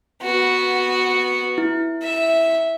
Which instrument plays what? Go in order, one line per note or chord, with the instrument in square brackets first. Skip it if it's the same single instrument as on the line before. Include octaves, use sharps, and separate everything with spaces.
[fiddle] B3 F#4
[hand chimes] E4
[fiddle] E5